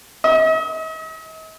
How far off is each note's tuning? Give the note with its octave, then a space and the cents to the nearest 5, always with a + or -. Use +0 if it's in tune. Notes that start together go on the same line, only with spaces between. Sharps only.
D#5 +45